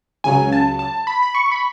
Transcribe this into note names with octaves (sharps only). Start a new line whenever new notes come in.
C#2 C#3 F#3 G#5
A5
A5
B5
B5
C#6
B5